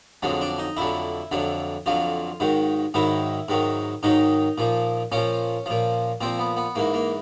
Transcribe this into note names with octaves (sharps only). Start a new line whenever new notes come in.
F2 D3 F#3 G#3
D4
D#4
F2 D3 F#3 E4
F2 D3 F#3
F2 D3 F#3 F4
G#2 D#3 F#3
G#2 D#3 F#3 E4
G#2 D#3 F#3
G#2 D#3 F#3 D#4
A#2 F3
A#2 F3 C#4
A#2 F3
A#2 F3 C4
B3
B3
G#2 E3 A#3
A#3